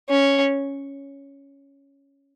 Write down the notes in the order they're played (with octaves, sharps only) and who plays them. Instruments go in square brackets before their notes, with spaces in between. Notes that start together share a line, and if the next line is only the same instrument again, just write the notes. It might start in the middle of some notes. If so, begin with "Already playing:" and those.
[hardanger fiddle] C#4